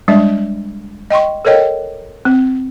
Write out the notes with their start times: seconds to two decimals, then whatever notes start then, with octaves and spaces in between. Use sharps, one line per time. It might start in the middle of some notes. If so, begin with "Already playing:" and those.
0.08 G3 G#3 D4 E5
1.10 D#5 G5 C6 C#6
1.45 A4 A#4 C#5 D#5 G5
2.25 C4